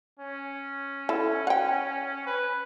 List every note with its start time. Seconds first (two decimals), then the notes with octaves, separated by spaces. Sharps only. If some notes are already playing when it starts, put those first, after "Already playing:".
0.20 C#4
1.09 E4 A4
1.47 F#5 G5
2.26 B4